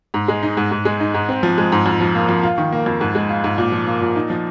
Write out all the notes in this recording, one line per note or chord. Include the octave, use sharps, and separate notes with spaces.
G#2
G#3
D#4
G#2
G#2
G#3
D#4
G#2
C4
F3
G#3
G#2
F2
F3
A#3
F2
F4
D#3
A#3
F2
G#2
G#3
F4
G#2
A#2
F3
A#3
A#2
D#4
F3